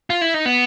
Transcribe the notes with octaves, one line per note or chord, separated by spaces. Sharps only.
F4
E4
D#4
B3